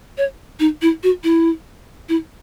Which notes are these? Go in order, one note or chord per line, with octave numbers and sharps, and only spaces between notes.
C#5
D#4
E4
F#4
E4
E4